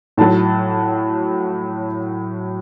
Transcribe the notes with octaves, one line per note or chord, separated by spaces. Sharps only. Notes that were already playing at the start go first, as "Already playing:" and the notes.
A2 F#3 A5